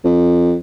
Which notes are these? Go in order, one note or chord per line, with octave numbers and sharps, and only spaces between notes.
F2